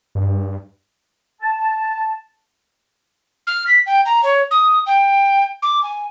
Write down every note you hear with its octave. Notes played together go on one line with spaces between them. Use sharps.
G2
A5
F6
B6
G5
A#5
C#5
D#6
G5
D6
G#5